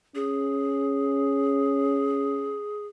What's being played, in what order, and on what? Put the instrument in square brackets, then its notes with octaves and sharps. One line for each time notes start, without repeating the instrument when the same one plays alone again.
[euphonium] C#4 [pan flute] G#4